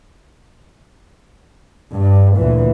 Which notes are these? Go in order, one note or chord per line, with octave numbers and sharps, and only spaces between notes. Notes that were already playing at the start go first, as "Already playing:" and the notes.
G2
D2 A#2 E3